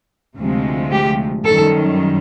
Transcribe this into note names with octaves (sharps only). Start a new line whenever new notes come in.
D2 C3 F3 G#3
G4
F#2 D#3 G3 A4